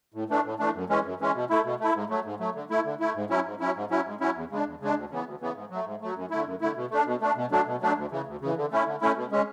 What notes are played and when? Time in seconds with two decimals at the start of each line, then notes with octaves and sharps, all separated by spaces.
0.14 A2
0.30 E3 A3 D4
0.45 A2
0.59 E3 A3 D4
0.75 F#2
0.89 E3 G#3 C#4
1.05 F#2
1.20 E3 G#3 C#4
1.35 B2
1.50 A3 E4
1.65 B2
1.80 A3 E4
1.95 G#2
2.10 F#3 A3
2.25 G#2
2.40 F#3 A3
2.55 D3
2.70 A3 E4
2.85 D3
3.00 A3 E4
3.15 G#2
3.30 F#3 C#4 E4
3.45 G#2
3.60 F#3 C#4 E4
3.75 G#2
3.90 F#3 C#4 E4
4.05 G#2
4.20 F#3 C#4 E4
4.35 E2
4.50 C#3 G#3 D4
4.65 E2
4.80 C#3 G#3 D4
4.95 D2
5.10 C#3 E3 B3
5.25 D2
5.41 C#3 E3 B3
5.55 G#2
5.70 F#3 A3
5.85 G#2
6.01 F#3 A3
6.16 F#2
6.30 D3 A3 E4
6.46 F#2
6.61 D3 A3 E4
6.76 B2
6.91 A3 D4
7.06 B2
7.21 A3 D4
7.36 B2
7.51 F#3 A3 D4
7.66 B2
7.81 F#3 A3 D4
7.96 D2
8.11 C#3 E3
8.26 D2
8.41 C#3 E3
8.56 D3
8.71 A3 C#4 E4
8.86 D3
9.01 A3 C#4 E4
9.16 B2
9.31 G#3 C#4